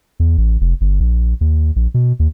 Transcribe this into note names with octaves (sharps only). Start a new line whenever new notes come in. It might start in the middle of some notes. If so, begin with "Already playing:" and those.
E2
A1
F1
G1
A#1
D#2
A#1
B2
D#2